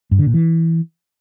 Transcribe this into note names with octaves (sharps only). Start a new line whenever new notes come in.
G2
D3
A#2
E3